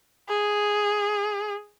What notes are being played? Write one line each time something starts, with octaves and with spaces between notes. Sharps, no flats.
G#4